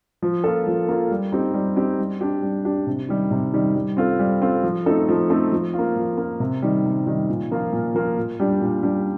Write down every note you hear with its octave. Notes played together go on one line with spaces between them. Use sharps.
F3
A#3 F4 A4
F3
A#3 F4 A4
G3
C4 D#4 G4
G3
C4 D#4 G4
G3
D4 G4
G3
D4 G4
C3
D#3 G3
C3
D#3 G3
G3
C4 F4 A4
G3
C4 F4 A4
F3
A3 C4 D#4 A4
F3
A3 C4 D#4 A4
F3
A#3 F4
F3
A#3 F4
C3
D#3 G3
C3
D#3 G3
A#2
F3 A#3 F4
A#2
F3 A#3 F4
A#2
G3 D4 G4
A#2
G3 D4 G4